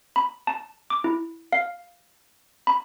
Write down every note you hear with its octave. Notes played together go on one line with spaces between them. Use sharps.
B5
A5
D6
E4
F5
B5